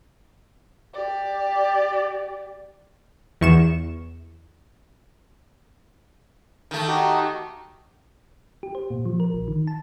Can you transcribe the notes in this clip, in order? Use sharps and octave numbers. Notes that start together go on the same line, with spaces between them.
G4 D5
E2 C#6 E7
D#3 A3
D#4 F#4 G4
G4
C5
A#2
F3
A#4
A#1
D#3
A5